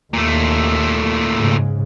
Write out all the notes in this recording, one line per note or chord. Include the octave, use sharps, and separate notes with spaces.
D#2 A#2 A3
G#2 C#3